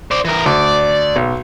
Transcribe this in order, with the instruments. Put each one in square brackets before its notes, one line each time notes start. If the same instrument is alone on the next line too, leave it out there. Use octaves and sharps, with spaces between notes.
[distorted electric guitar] C5 D5
E3 A#4
[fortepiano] D2 [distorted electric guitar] D5
[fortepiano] B1